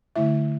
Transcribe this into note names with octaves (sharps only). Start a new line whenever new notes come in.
D3 A3 E4 E5